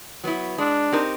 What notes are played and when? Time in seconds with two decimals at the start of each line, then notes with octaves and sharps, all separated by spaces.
0.24 F#3 B3 E4
0.58 G#3 D4
0.92 C4 D#4 G4 A#4